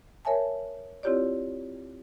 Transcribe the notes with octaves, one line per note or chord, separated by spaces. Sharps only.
A#4 C#5 E5 G#5 A5
C4 E4 F4 G4 C#5 D5